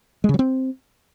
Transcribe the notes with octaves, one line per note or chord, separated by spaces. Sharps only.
G#3
C#3
F#3
C4